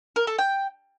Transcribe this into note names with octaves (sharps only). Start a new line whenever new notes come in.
A#4
A4
G5